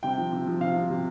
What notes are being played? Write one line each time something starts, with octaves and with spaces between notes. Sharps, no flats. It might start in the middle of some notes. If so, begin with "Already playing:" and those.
C3 G5
F3
C3
F3
C3 F5
F3
C3